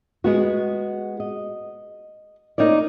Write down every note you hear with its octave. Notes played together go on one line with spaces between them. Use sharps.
G#3 B3 F#4
D#5
A#3 D#4 A#4 C#5 D5